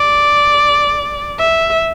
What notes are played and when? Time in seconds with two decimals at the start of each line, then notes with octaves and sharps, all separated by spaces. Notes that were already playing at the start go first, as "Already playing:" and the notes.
Already playing: D5
1.40 E5